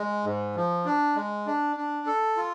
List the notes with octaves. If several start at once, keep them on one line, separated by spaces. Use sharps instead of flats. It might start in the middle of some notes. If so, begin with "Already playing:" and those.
Already playing: G#3
G#2
F3
D4
G#3
D4
D4
A4
F4